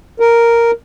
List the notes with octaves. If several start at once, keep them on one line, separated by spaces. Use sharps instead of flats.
A#4